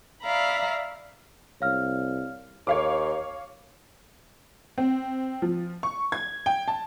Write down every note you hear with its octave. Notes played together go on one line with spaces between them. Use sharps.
D5 E5 F5 A#5 B5
C2 C#5 F5 F6
D#2 C#5 F5 D6
C4
F3
C#6
G#6
G5
A5